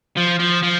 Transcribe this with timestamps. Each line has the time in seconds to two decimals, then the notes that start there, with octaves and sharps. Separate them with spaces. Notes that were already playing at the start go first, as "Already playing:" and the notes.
0.17 F3
0.40 F3
0.63 F3